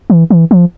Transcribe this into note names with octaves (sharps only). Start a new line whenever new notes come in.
E3
E3
F3